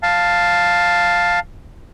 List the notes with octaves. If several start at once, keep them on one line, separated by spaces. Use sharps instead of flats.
F5 A5